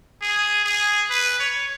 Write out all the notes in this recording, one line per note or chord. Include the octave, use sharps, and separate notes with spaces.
G#4
G#4
B4
C#5